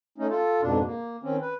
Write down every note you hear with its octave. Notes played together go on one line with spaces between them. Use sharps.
A3 C#4 D#4
F4 A4
F2 G#2 B2 D4
A#3
D#3 C4 C#4
B4